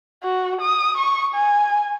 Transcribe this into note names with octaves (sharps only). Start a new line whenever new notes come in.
F#4
D#6
C#6
G#5